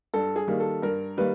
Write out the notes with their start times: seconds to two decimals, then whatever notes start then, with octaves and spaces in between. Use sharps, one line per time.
0.14 G2 A4
0.36 G#4
0.48 D#3 G3 A#3
0.60 A4
0.82 G2 A#4
1.17 D#3 G3 A#3 B4